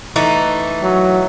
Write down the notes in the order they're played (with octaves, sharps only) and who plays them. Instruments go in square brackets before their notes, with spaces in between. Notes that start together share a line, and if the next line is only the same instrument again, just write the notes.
[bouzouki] E3 A3 D#4
[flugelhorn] F#3